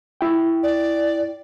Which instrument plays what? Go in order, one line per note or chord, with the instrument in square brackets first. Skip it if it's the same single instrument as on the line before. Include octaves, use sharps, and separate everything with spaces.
[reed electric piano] E4 G5
[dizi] D5